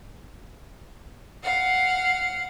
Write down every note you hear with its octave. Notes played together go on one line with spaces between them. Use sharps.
F5 F#5